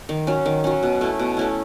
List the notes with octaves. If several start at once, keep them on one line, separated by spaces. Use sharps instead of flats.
D#3
F#3 C#4
D#3
F#3 C#4
B2
A3 C#4 E4
B2
A3 C#4 E4